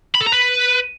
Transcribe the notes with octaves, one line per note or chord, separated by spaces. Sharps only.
B5
A4
A#5
B4